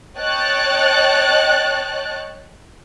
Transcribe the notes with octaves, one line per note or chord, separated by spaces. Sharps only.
C#5 D#5 G5 A5 F#6 A6